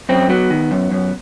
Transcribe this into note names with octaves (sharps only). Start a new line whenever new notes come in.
F#2 C4
F#3 B3
D#3
F#2
F#2